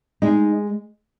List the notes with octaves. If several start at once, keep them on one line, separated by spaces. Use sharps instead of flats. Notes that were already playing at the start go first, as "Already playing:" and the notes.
G#3 D#4 G#4